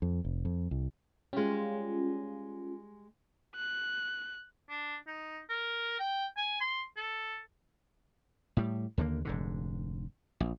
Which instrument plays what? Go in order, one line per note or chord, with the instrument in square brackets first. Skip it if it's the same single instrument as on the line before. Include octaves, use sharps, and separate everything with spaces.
[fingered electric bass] F2
F1
F2
C2
[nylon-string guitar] G3 G#3 [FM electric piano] C#4 F4
[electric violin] F#6
[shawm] D4
D#4
A#4
G5
G#5
C6
A4
[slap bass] A2 G3
D#2 D3 F3 A#3
F1 G#2 D3
A#1